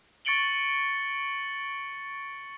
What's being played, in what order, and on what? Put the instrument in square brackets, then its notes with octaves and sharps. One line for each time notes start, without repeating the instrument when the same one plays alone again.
[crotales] C#6 A6 C#7 D7 F#7 G7